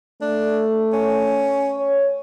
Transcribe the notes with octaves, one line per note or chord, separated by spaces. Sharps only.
A3 D4
C#4
C#5